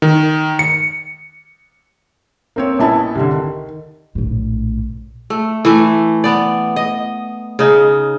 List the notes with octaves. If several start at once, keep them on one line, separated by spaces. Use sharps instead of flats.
D#3
C#7
A#3 C4 C#5
A#1 B3 C#4 E4 D#5 A5
C2 D3
D#3
A#1 A2
A3
E3 A3
B3 D5
D#5
C#3 D#4